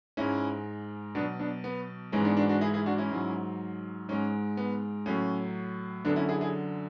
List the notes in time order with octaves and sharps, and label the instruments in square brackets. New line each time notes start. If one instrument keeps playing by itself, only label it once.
[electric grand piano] G#2 G#3 C#4 E4
B2 F#3 B3 D4
B3 D4
B3
G#2 E3 G#3 C#4
B3 D4
D4 F#4
D4 F#4
E4 G#4
E4 G#4
D4 F#4
C#4 E4
G#2 F#3
G#2 G#3 C#4
B3
A2 F#3 C#4
F#2 D3 F#3 B3 D4
C#4 E4
E4 G#4
E4 G#4